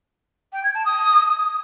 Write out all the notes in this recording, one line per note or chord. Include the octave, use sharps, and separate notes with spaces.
G5
G#6
A5
D#6